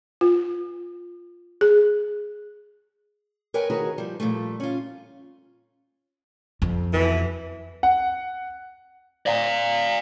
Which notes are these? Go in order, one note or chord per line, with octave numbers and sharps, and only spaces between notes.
F4
G#4
A#4 B4 C#5 D#5 G5 G#5
D#3 F#4 G#4 A#4 B4 C#5
F3 G3
A#2 F3 G3 A3
C#4 F4
F2
B2 E3
F#5
D5 F5